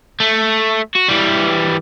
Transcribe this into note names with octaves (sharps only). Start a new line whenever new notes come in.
A3
F#4
E3 G3